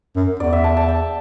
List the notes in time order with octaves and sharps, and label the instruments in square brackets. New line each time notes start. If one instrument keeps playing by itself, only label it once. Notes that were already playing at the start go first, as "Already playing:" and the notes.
[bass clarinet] F#2
[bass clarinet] E2 [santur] D5
[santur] E5
A5
A5
G5